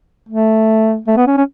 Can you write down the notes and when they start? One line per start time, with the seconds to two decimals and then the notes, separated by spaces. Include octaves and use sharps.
0.29 A3
1.07 A3
1.17 B3
1.27 C#4
1.37 C#4